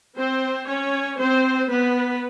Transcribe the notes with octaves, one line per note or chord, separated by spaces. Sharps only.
C4 C5
C#4 C#5
C4 C5
B3 B4